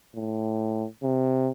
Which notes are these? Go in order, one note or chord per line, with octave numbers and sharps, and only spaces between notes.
A2
C3